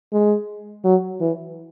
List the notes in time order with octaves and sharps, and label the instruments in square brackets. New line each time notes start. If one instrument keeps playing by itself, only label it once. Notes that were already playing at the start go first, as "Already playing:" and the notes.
[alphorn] G#3
F#3
E3